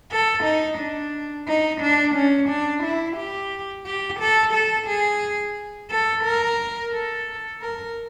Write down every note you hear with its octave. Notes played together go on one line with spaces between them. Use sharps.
A4
D#4
D4
D#4
D4
C#4
D4
E4
G4
G4
A4
A4
G#4
A4
A#4
A4
A#4